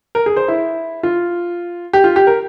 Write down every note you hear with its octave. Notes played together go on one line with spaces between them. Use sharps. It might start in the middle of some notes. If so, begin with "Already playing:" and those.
A#4
G#4
C5
E4
F4
G4
F4
G4
A#4